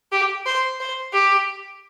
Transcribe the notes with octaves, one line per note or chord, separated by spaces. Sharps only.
G4
C5
C5
G4